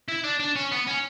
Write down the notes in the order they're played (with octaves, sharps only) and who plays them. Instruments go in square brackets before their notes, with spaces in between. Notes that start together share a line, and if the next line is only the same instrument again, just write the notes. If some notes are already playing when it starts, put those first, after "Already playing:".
[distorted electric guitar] E4
D4
D4
C#4
B3
C#4